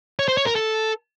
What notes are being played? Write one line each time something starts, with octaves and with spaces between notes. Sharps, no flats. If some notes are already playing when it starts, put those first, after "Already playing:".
C#5
C5
C#5
A#4
A4